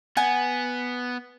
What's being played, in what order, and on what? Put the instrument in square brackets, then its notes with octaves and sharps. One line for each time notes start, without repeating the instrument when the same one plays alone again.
[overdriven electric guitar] B3 [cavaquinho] F#5 G#5